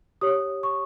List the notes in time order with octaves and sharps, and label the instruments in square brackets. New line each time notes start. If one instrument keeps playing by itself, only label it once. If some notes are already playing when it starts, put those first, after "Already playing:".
[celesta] G4 C#5 D#6
C#6